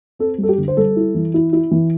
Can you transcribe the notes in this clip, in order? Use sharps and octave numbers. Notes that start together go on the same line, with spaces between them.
C4 A4
G3
A4
G4
D3
C5
G3 A4
E4
E3
E4
E4
E3